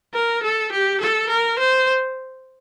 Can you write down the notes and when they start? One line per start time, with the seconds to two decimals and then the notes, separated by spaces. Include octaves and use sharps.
0.14 A#4
0.43 A4
0.72 G4
1.00 A4
1.29 A#4
1.58 C5